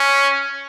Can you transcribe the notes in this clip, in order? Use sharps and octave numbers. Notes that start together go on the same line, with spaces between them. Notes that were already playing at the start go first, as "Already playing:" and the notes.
Already playing: C#4